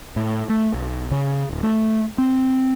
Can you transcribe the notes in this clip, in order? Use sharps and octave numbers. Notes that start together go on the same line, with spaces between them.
A2
A3
B1
C#3
D1
A3
C4